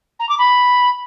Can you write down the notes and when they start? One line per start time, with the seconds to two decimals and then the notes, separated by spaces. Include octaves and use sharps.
0.19 A#5
0.29 D6
0.38 B5